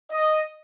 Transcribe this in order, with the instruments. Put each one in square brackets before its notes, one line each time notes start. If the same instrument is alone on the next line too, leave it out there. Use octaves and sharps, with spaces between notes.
[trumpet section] D#5